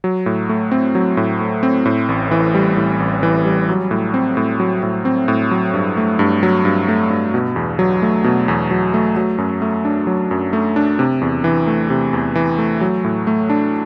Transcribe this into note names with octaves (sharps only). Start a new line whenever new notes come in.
F#3
A2
A3
C4
F#3
A2
A3
C4
A2
A1
E3
G3
A2
A1
E3
G3
F#3
A2
C4
A2
F#3
A2
C4
A2
F#3
G2
A3
G2
F#3
G2
A3
G2
B2
E2
F#3
A3
B2
E2
F#3
A3
F#3
F#2
A3
D4
F#3
F#2
A3
D4
C3
E2
E3
A3
C3
E2
E3
A3
F#3
A2
A3
D4